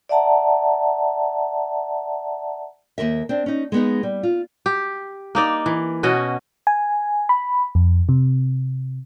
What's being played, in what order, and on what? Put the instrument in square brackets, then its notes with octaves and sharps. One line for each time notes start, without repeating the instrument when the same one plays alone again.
[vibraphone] D5 E5 F#5 A5 A#5
[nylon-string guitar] D#2 G#2 A#4 E5
C4 D4
C#4 D#4
G#3 B3 D#4
G3
F4
[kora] G4
A#3 D#4 D5
E3
B2 C#4 F#4 D#5
[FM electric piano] G#5
B5
F2
C3